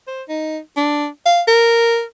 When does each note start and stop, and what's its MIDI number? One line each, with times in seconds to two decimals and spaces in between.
0.07 0.23 72
0.29 0.59 63
0.77 1.06 62
1.26 1.42 77
1.48 2.03 70